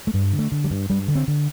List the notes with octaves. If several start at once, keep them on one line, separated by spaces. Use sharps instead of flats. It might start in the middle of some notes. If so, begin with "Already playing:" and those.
A3
G2 G3
D3
A3
D3
G3
G2
G2 G3
D3
C4
D3